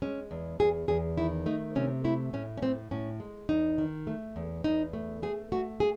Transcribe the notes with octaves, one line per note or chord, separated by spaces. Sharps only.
G#3 C#4
E2
E2 G#4
E2 G#4
D#3 E4
A3 D#4
C3 C#4
A3 E4
A2 C#4
C#4
A2 C4
A2 C#4
G#3
E2 D#4
D#3
A3
E2
E2 D#4
A3
A3 G#4
A3 F#4
G#4